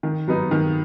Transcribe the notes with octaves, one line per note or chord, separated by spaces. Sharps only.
D#3
F#3 B3 D#4
D#3